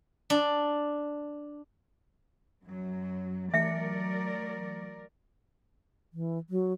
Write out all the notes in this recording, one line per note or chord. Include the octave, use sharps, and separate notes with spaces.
D4
F#2 F#3
E3 F#3 A3 A#4 D5 E5 C#7
E3
F#3